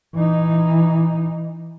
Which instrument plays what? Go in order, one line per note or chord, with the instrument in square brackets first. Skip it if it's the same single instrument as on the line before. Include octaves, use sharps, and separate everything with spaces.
[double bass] E3 D#4